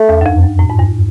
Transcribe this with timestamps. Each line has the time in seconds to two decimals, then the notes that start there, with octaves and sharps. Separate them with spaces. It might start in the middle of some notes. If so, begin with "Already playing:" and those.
Already playing: A3
0.09 E2
0.21 F#2
0.26 F2
0.42 F#2
0.59 A2
0.70 G#2
0.79 G2